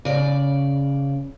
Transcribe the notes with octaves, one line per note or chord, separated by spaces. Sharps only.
C#3 D5